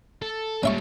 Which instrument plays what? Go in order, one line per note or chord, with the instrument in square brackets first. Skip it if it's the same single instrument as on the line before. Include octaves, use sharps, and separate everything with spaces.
[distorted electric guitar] A4
[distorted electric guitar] A#2 G3 [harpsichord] C#4 E5 C#6